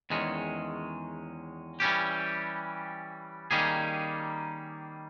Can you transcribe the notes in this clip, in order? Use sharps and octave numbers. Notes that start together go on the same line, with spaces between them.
E2 D#3 G#3 C#4
E3 G3 C#4 G4
D#3 G3 A#3 C#4 G#4